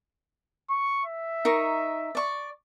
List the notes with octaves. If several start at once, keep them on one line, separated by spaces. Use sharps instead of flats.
C#6
E5
D#4 A#4 C#6
D5 C#6